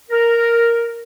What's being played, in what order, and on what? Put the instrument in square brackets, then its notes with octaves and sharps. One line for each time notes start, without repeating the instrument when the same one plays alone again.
[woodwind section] A#4